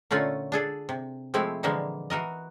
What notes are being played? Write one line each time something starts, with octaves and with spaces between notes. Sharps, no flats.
A#2 D3 A3 C#4 F4
D4 G#4 A4
C3
F3 G#3 A3 C4 E4
A#2 D3 E3 F3 G#3 A#3
E3 F#4 A#4 D#5